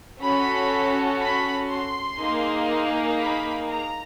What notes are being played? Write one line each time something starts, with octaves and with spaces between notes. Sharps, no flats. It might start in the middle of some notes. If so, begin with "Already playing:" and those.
C#4 F#4 A4 B5
B5
C6
A#3 D#4 G#4
B5
A#5